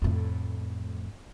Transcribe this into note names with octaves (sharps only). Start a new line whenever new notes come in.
F2 A2